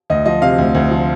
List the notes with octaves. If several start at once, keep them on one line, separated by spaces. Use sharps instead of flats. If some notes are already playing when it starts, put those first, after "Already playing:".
D2 D#5
F3 D#5
C3 F5
D2
D2
F3